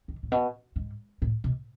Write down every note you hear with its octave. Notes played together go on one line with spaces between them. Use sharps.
D#3
A2
B2
G#2
A2
B2